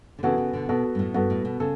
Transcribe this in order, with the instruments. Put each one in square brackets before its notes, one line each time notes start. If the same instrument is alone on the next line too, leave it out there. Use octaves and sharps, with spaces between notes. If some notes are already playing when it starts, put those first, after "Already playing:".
[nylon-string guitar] D3
[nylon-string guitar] C#3 E3 [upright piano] B3 F#4 A4
[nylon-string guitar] C#3
B2 D3
[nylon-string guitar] B2 [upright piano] B3 F#4 A4
[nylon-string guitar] G2
A2
[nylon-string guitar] G2 [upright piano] B3 F#4 A4
[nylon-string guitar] A2
B2
[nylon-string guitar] C#3 [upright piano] A4